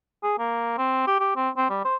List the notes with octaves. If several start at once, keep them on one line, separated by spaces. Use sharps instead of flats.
G#4
A#3
C4
G4
G4
C4
C4
G3
C5